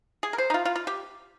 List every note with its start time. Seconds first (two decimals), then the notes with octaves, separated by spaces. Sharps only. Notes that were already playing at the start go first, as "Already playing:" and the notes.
0.23 G#4
0.33 A#4
0.38 C5
0.50 D#4
0.54 F4
0.65 F4
0.76 F4
0.87 G4